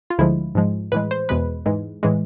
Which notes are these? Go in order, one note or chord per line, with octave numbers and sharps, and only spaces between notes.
F4
D2 D3 F3 G#3 E4
G#2 F3 G#3
A2 E3 G#3 B4
C5
E2 B2 G#3 B4
G#2 E3 G#3
A2 E3 G#3